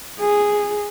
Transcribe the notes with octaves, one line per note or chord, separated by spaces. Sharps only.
G#4